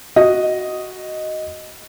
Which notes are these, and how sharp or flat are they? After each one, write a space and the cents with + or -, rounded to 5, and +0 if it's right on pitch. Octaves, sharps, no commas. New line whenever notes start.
F#4 +0 D#5 +0